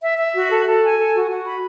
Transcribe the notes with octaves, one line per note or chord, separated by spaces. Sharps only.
E5
E5
F#4
A4
A4
G#5
A4
F#4
F#4
B5